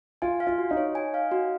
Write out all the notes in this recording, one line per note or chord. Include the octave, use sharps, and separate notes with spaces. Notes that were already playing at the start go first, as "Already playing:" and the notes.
F4 G#5
F5
F4
F#4
D#4
C#5
G#5
F5
F#4